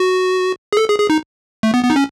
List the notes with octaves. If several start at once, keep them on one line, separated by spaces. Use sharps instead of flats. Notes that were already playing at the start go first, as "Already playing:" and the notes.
Already playing: F#4
G#4
A4
G#4
G#4
D#4
A3
B3
B3
D#4
C#4